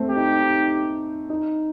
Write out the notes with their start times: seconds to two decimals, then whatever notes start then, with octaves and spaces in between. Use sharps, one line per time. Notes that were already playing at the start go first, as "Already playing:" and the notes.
Already playing: A3 C4
0.10 G4
0.16 D#4
0.39 D#4
1.30 D#4